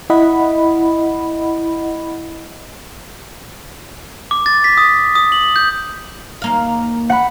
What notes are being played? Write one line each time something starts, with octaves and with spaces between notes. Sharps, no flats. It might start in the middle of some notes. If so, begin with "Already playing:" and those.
E4 D#5 F#5 B5
D6
A6
B6
D#6
D#6
F#7
G6
D#2 A#3 F5
F#5 B5